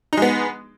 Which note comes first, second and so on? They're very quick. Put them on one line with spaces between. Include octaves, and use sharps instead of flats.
D#4 G#3 B3